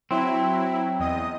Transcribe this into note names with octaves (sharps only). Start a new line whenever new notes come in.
F#3 C4 E4
E2 D#5 D#6